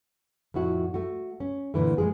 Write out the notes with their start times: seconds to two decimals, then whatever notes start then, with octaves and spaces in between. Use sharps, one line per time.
0.54 F2 A2 E4 F#4
0.94 A3 F#4
1.40 C#4
1.74 A#2 D3 E3 A3
1.98 F3 G#3 A#3 G#4